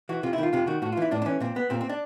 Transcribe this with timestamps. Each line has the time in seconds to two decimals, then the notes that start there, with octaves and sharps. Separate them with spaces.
0.09 E3 F#4
0.23 C3 F4
0.33 E4
0.38 D#3 F4
0.53 C3 F4
0.67 D#3 F#4
0.82 A2 F#4
0.92 F4
0.97 E3 E4
1.11 A2 D4
1.22 D4
1.26 E3 C#4
1.40 A#2 C4
1.56 B3
1.70 A#2 C4
1.81 C4
1.90 D4